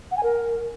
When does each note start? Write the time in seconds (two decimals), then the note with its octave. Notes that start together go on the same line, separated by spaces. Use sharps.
0.11 F#5
0.17 G#5
0.23 A#4